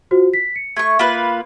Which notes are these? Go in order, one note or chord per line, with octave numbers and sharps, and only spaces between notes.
F4 F#4 C5
B6
C#7
A3 C#6 G#6
A#3 F4 B4 B6